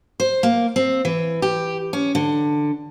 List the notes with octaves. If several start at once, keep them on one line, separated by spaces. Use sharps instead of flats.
C5
A#3
C4
E3
G4
C#4
D3